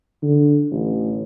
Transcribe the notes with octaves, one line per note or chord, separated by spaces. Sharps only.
D3
A1